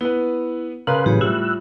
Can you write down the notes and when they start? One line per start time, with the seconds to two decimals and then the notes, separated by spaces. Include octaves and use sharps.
0.01 B3 E4 B4
0.87 C#3 A#4 B4 F5 C6 F#6
1.06 A2 E3 F#3 G4 G#4 C#5
1.21 A2 G3 F4 E6 F#6